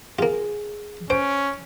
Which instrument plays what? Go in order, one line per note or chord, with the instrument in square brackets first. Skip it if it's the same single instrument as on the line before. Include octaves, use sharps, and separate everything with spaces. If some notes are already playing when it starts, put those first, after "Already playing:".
[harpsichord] A#3 F4 [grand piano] G#4
[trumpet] C#4 [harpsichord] C5 [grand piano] D7